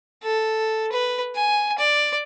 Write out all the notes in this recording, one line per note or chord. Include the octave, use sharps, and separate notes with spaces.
A4
B4
G#5
D5